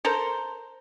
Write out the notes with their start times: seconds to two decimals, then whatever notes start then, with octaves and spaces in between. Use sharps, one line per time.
0.05 A4 A#4 C5